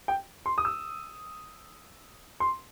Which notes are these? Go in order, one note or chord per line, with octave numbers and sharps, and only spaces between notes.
G5
C6
D#6
E6
C6